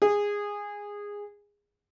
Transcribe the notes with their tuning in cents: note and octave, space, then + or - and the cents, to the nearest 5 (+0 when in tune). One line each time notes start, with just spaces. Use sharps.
G#4 -15